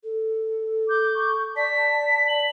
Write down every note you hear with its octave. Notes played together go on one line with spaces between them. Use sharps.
A4
D6 G6
C#6
D5 A5 B6
F#7